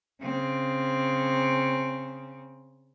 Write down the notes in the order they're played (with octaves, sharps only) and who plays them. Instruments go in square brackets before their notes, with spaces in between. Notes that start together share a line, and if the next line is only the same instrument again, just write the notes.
[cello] C#3 C4